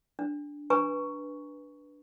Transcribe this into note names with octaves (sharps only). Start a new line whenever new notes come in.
D4
D4 B4 G#5 A#5 C#6